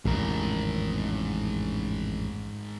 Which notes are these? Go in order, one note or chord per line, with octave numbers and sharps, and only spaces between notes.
A1 F2 G#2 C#3 A#4